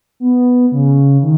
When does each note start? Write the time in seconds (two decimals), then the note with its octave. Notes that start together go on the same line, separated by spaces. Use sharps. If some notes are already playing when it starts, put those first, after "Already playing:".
0.20 B3
0.72 C#3
1.22 D#3